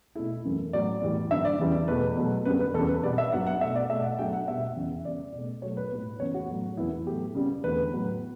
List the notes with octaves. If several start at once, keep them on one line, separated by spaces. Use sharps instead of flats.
B2 A3 E4
F#2 E3 A3
A2 F#3 B3 D5
A2 E3 G3
G2 D3 F#3 B3 E5
D5
E2 C#3 E3 G3 B3
E2 B2 A3 B4
B2 F#3 A3
F#2 D3 G3 B3 B4
B4
E2 C#3 G3 A4
B4
B2 G3 B3 D5
E5
G2 F#3 B3 F#5
F#5
B2 A3 E5
D5
B2 A3 E5
F#5
G2 F#3 A3 G5
F#5
B2 G3 B3 E5
E2 C#3 E3
C#3 G3 B3 D5
B2 A3
B2 F#3 A3 C#5
B4
A2 G3 B3
C#3 E3 B3 C#5
F#4
A2 F#3 A3
E2 C#3 E3 B3 E4
A2 F#3 A3 G4
C#3 G3 B3
E2 D3 A3 B4
A2 F#3 B3